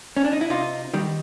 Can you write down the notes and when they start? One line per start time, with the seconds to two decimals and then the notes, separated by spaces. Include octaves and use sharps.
0.17 C#4
0.24 D4
0.33 D#4
0.41 E4
0.50 C3 D#4 F4
0.94 D#3 G3